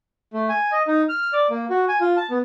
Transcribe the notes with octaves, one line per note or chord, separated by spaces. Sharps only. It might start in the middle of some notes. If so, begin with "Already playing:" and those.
A3
G#5
D#5
D#4
F6
D5
A#3
F#4
G#5
F4
A5
B3